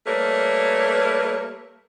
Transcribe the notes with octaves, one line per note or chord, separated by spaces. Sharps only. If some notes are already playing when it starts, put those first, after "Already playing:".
G3 A3 A#3 A#4 B4 C#5